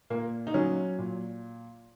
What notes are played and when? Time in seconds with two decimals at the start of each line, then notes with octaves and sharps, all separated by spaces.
0.10 A#2 A#3
0.47 D#4
0.54 F#3 C#4
0.98 A#2